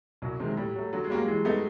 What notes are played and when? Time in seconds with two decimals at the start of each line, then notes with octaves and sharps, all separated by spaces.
0.22 C2 F#3
0.40 C3 D#3 G#3 C4
0.57 A2 G3
0.76 F#3 A3
0.93 D3 F#3
1.04 G#3
1.10 F#3 G3 A#3 C#4
1.28 E3 G#3
1.45 G3 A3 B3 D#4